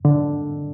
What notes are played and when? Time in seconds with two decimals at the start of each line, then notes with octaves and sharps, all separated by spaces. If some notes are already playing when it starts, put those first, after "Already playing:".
0.05 D3